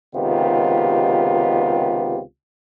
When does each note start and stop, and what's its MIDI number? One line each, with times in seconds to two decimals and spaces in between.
0.15 2.20 37
0.15 2.20 48
0.15 2.20 51
0.15 2.20 59
0.15 2.20 65
0.15 2.20 67